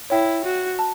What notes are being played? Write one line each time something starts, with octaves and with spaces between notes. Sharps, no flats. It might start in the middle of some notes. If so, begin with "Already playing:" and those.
E4 C#5 E5 G5
F#4
A5